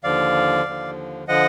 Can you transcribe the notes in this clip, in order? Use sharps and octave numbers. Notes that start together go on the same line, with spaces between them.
D#2 D3 F3 D5 F5
D#2 D3 F3
D3 F3 D#5 F#5